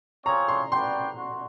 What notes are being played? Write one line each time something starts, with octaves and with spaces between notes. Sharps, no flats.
C4 F4 G#4 C#5 A#5
C6
F#4 B4 D5 G5 C6
F#4